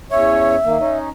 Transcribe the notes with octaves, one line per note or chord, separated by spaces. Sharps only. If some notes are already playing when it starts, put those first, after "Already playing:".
E2 C#4 C#5 E5
D#3 A#3
C#4 D#4